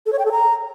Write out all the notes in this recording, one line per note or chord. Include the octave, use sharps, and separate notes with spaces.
A4
C#5
G5
A4
A#5